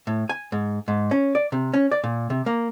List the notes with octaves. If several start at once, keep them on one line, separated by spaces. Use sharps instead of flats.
A2
G#5
G#2
G#2
C#4
D5
C3
C#4
D5
A#2
C3
A#3